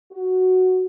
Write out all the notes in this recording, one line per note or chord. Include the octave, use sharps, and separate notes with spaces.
F#4